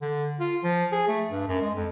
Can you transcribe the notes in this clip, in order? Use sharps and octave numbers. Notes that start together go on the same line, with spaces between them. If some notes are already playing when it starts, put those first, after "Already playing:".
D3
F4
F3
G#4
A3
G2
F#2
G#3
F2